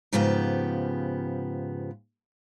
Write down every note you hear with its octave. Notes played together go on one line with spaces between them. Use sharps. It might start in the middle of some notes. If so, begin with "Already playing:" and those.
G#2 C#3 F3 B3 G4